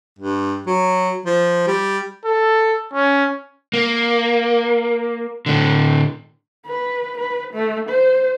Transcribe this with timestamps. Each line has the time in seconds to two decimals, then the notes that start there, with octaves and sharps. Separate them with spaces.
0.19 G2
0.66 F#3
1.26 F3
1.67 G3
2.25 A4
2.93 C#4
3.73 A#3
5.46 A2 D3
6.66 B4
7.18 B4
7.53 A3
7.89 C5